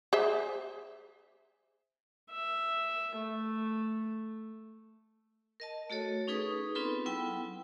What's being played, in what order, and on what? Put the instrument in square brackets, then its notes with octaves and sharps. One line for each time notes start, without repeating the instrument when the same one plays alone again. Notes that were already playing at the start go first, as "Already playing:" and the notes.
[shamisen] G#4 C5 E5
[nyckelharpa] E5
A3
[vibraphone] A#4 D#5 A5
A3 F#4 A4 C#5
C#4 D#4 G#4 B4 C#6 D#6
B3 C4 D#4 F4 A4 B4
F#3 B3 E4 G5